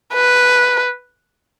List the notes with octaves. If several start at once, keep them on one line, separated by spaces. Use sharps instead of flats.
B4